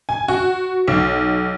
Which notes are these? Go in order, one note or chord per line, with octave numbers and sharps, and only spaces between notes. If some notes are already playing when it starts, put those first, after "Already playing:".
G#5
F#4
B1